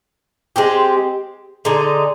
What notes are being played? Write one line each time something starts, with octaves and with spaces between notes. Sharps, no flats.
G#3 C4 G4
D3 G#3 D#4